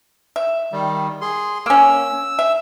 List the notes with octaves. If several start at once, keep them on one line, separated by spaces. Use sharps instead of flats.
E5
D#3 G3
G#4 C6
A#3 C#4 E6
E5